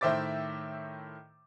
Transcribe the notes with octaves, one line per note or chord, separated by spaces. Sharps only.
A2 D#3 C5 E5 D6 A6